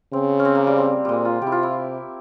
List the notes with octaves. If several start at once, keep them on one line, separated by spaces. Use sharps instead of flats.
C#3 C4
C#4
C4
A#3
G3
C4
A#2 G3 G#3
F4
C3 G4
E4
F4
E4